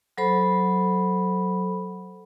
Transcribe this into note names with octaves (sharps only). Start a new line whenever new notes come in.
F#3 A4 C5 B5